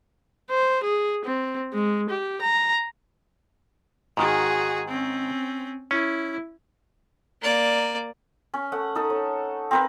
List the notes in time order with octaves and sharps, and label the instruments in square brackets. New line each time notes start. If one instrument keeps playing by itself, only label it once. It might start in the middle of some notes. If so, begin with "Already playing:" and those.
[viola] C5
G#4
C4
G#3
G4
A#5
[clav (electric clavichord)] G#2 D#3 [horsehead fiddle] F#4 G#4
[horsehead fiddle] C4 C#4
[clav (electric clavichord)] C#4 [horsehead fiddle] E4
[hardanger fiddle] A#3 D5
[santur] C#4
A3 F#5
D#4 A4
C#5
C4 A#4 B4